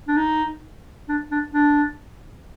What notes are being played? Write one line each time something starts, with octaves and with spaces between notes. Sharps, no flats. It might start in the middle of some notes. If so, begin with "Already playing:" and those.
D4
D#4
D4
D4
D4